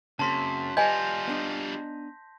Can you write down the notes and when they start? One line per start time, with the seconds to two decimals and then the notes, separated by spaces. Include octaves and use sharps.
0.19 F#2 C#3 A#3 C4 A5 C6 B6
0.77 G3 F4 G4 B4 D#5 G#5 G6 A#6
1.27 B3 D4 D#4